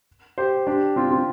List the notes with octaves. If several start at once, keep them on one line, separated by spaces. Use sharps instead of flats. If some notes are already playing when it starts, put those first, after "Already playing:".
G4 C5
D4 G4
C4 F4
C4 F4